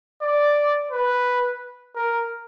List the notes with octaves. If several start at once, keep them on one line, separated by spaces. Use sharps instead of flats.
D5
B4
A#4